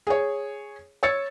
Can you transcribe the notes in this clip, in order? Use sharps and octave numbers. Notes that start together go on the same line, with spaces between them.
G#4 C#5
C#5 E6 A6 C#7